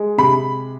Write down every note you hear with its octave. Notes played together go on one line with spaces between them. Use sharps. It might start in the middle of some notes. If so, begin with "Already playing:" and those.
Already playing: G#3
C3 B5